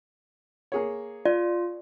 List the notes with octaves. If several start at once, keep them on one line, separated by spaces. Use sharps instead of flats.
A#3 G#4 C#5
F4 D5